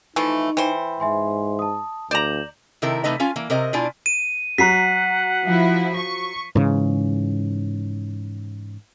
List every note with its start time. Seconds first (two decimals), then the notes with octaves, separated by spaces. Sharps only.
0.16 E3 F3 A3 D#4
0.57 E3 C5 G5
1.00 G#2 E5 G#5 C6
1.59 A5 D#6
2.11 D2 D5 A#5 G6 E7 F#7
2.82 C3 D#3 E4 A4 A#4
3.04 C3 E3 A3 D#4 B4 D#5
3.20 C#4 F4 F5 G#5
3.36 E3 A#3
3.50 C3 A#4 C5 D#5
3.73 B2 D4 E4 F4 G#5
4.06 D#7
4.58 F#3 F#5 A#5 B6 C7
5.44 F3 E4
5.96 C#6
6.55 G#2 C#3 E3